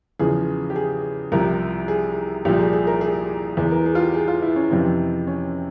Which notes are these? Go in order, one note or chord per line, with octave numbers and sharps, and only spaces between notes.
E2 C#3 F3 G#4
G4
G#4
C2 C3 F3 A#4
G#4
C2 A#2 F3 G4
G#4
G#4
A#4
G#4
E2 E3 G#4
A#4
G#4
F4
G4
G#4
F4
E4
C#4
F2 C3 E3 C4
C#4